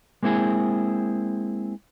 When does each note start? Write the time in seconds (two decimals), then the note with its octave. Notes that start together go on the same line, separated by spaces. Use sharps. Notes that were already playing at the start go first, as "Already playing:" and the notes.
0.23 G#3 A#3 C4 E4 G#4